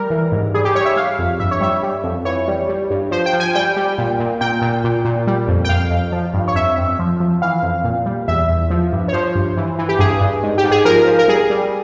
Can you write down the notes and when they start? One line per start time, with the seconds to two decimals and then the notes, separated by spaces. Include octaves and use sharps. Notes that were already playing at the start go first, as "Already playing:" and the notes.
Already playing: G3 A#4
0.10 E3
0.32 G#2
0.54 G3 G#4
0.65 G4
0.75 G3 C#5
0.86 E5
0.96 G3 F5
1.19 F2
1.40 G2 E5
1.51 C#5
1.61 G3 E5
1.83 G3
2.04 F2
2.25 E3 C#5
2.48 G3
2.69 G3
2.91 G2
3.11 F3 C5
3.26 G5
3.33 F3
3.40 G#5
3.54 G3 G5
3.77 G3
3.98 A#2
4.20 A#2
4.41 A#2 G5
4.62 A#2
4.84 A#2
5.05 A#2
5.27 G3
5.48 F2
5.65 G5
5.69 F2 F5
5.91 F2
6.12 F3
6.34 G2
6.48 C#5
6.56 F2 E5
6.77 F2
6.99 F3
7.20 F3
7.42 E3 F5
7.63 F2
7.84 A#2
8.06 G3
8.28 E2 E5
8.50 E2
8.70 F3
8.92 G2
9.08 C#5
9.13 F3 C5
9.35 G2
9.57 E3
9.79 E3
9.89 G4
9.99 G2 G#4
10.21 G2
10.43 G#2
10.58 G4
10.64 G#2
10.71 G#4
10.85 F3 A#4
11.07 F3
11.19 A#4
11.28 G3 G#4
11.50 G3